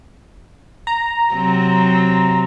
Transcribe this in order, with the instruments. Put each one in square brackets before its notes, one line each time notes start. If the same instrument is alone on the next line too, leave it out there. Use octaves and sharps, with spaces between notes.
[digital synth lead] A#5
[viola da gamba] C3 F#3 C4